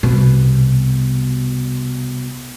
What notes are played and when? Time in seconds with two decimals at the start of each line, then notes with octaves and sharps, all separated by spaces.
0.03 C2 B2